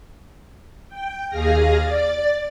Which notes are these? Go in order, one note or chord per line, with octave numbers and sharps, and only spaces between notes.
G5
D#2 G#4 F5 F6 A#6
D5 A6